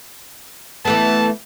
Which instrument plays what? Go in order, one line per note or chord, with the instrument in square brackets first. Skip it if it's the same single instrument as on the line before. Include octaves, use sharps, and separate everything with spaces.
[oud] E3 A3 B3 [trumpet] A5